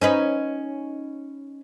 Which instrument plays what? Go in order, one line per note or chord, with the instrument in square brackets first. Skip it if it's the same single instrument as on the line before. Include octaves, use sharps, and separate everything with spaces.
[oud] C#4 D#4 B4